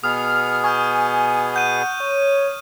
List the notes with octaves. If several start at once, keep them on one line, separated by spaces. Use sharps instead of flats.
B2 B3 G#4 D#6 F6
G#5 C#6 F6 G6
F#5 G6 D#7
C#5